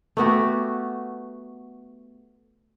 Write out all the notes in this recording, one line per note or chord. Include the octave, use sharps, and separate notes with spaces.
A3 B3 F#4 G4